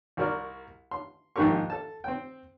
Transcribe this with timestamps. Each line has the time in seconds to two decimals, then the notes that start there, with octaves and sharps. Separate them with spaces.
0.17 C2 F#4 A#4 D5 F6
0.91 C6
1.36 A#1 G#2 D#3 G4 A#4 C#6
1.70 A4 A5
2.04 C4 G5